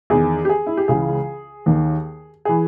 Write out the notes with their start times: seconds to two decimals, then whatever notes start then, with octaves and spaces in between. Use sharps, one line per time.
0.10 E2 D#3 G#4
0.45 G4
0.49 G#4
0.67 E4
0.77 G4
0.88 C#2 C#3 E3 G#4
1.66 D#2 D#3
2.45 E3 G#4